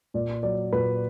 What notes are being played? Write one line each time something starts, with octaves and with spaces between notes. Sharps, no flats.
A#2 D5
F#3 D5
A#2 B4